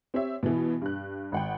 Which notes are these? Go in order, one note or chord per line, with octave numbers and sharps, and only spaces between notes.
C4 G4 C#5 E5
B2 E3
G2 F#6
G#1 F#5 G5